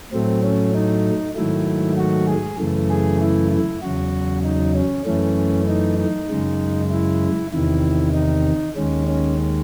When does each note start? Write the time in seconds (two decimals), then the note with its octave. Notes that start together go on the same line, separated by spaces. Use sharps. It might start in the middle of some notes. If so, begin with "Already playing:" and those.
0.12 A2 F#3 A3 C4
0.43 C#4
0.75 D#4
1.35 G#2 D#3 F#3 A3 E4
1.98 F#4
2.28 G#4
2.59 F#2 C#3 E3 A3
2.90 G#4
3.21 E4
3.51 E4
3.82 E2 C#3 F#3 F#4
4.44 D#4
4.75 C#4
5.06 F#2 E3 A3 C#4
5.68 D#4
5.98 D#4
6.30 F#2 C#3 G#3
6.92 E4
7.53 E2 C3 D#3 E4
8.14 D#4
8.76 D#2 D#3 G#3 C#4
9.07 C#4